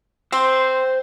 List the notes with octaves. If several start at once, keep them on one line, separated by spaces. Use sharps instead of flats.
C4 C5